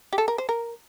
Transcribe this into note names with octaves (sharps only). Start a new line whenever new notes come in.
G4
A4
A#4
C5
A#4